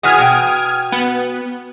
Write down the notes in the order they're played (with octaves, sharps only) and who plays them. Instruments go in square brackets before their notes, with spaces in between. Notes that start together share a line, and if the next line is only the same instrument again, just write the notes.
[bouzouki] E3 F#4 G#4 [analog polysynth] D#6 F6 G#6
[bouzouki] B2 G5
[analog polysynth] B3